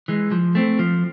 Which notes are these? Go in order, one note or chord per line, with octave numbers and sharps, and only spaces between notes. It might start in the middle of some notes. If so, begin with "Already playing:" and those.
E3 G#3
F3
A3 C4
F3